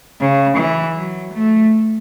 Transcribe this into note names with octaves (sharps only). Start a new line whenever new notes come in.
C#3
E3
F#3
A3